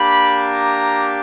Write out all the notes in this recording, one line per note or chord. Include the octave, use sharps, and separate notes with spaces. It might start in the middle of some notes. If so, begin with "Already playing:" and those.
Already playing: A#3 D4 G4 B5
A#5